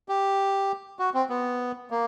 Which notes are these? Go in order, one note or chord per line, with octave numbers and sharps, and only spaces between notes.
G4
F#4
C4
B3
A#3